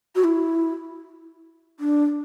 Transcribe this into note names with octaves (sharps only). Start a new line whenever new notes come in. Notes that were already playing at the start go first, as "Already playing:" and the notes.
F#4
E4
D4